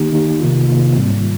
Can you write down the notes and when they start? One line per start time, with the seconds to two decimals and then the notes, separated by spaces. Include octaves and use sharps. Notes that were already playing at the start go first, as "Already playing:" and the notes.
Already playing: D#3 A#3 D#4 G4
0.13 D#3 A#3 D#4 G4
0.40 C3 D#3 A#3 F4
0.68 C3 D#3 A#3 F4
0.96 G#2 G3 C4